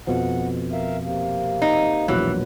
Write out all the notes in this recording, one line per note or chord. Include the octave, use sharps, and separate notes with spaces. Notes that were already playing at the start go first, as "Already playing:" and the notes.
F2 B2 F3 F#5
A#4 E5 F5
C3 A#3
D#4
E1 A#1 E3 F#3